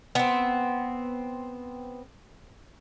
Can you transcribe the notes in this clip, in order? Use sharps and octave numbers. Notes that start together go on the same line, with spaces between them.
B3 C4